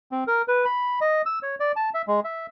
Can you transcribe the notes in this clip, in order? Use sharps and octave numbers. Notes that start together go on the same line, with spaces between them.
C4
A#4
B4
B5
D#5
E6
C#5
D5
A5
E5
G#3
E5